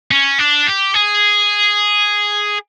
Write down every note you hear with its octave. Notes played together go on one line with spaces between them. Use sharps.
C#4
D4
G4
G#4